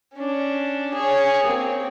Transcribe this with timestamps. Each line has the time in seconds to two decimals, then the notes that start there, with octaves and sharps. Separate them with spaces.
0.14 C#4 D4
0.95 G#4 C#5
1.44 A#3 C4